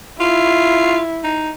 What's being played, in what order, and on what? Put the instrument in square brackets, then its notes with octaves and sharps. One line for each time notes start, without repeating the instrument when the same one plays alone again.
[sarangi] E4 [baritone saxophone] F4
[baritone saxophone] D#4